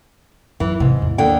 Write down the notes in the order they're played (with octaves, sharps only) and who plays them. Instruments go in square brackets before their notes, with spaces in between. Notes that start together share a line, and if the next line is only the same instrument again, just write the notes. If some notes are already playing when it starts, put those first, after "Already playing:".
[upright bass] F#2 [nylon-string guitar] E3
[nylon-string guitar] G#2 [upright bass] C3
[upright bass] E2 D#3
[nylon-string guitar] D#2 D3 G5